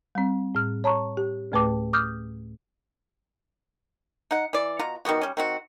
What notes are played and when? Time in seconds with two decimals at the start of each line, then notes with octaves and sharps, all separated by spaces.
0.15 G3 C4
0.55 A2 F6
0.84 C#5 A5 A#5 C#6
1.17 G4
1.52 D2 A2 A3 B4 A5 D6
1.93 D6 D#6 F6 G6
4.31 D#4 F#5
4.53 E3 D5
4.79 B2 F4 F#5 A#5
5.05 D#3 G3 B3 F#4
5.21 G3 C#4
5.37 D#3 C4 F#4